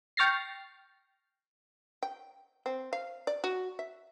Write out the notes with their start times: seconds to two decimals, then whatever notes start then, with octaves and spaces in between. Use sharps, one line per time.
0.17 G5 C#6 F6 A6 A#6 C7
2.03 G5
2.66 C4
2.93 F5
3.27 D5
3.44 F#4
3.79 E5